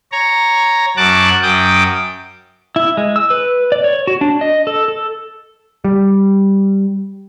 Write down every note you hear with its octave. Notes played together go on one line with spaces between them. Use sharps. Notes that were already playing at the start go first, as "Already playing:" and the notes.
C#5 A#5
F#2 F#4 A5 D6 F#6
F#2 G5 D6 D#6
E4
G#3
E6
B4
D5
C#5
F#4
D4
D#5
A4
A4
G3